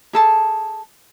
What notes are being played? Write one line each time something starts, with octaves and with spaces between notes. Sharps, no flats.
G#4 A4 A5